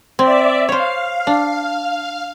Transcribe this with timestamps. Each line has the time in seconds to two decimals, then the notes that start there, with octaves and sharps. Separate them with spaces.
0.19 C4 D5 E5
0.69 C5 C#5 F5
1.27 D4